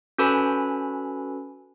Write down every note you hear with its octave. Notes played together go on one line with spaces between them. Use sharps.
C#4 F#4 A4 B4 G#5 B5